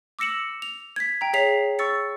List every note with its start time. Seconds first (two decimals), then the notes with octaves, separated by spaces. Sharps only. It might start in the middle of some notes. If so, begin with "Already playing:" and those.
0.19 D6 E6 A#6 C#7 E7 F#7
0.62 F7
0.96 G#6 B6
1.21 G5 A#5
1.33 G#4 C#5 E5 B6 C7 F7
1.79 C#6 E6 A6 C#7